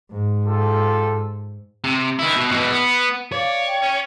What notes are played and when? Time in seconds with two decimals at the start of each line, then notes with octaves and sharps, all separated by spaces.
0.12 G#2
0.46 F4 G4 A4
1.84 C3
2.19 D#3 E4
2.36 B2
2.51 B2 E3
2.72 B3
3.32 C#5 D5 F5
3.67 G5
3.82 C#4